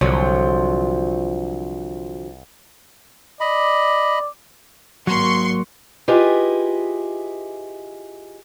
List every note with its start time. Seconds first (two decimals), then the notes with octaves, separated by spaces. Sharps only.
0.01 C2 D3 F3 F#3
3.40 D5 D#5 B5
5.07 G#1 F#3 A#3 C6 C#6
6.08 E4 F4 G4 G#4 B4 D#5